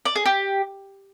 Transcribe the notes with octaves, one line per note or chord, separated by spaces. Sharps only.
D5
G#4
G4